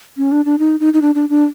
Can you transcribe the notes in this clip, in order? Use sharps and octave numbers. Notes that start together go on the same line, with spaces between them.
C#4
D4
D4
D#4
D#4
D#4
D4
D4
D4